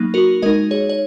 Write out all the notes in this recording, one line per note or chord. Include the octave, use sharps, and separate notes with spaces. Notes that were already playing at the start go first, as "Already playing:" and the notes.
Already playing: F#3 A#3 D#4
F#4 A#4
G#3 D#4 A#4 D#5
G#4 C#5
C#5